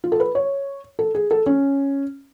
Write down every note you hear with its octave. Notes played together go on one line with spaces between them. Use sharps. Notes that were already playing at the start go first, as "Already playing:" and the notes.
F4
A4
B4
C#5
A4
G#4
A4
C#4